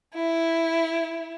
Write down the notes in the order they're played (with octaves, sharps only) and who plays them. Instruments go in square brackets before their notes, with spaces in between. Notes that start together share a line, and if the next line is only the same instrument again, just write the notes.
[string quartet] E4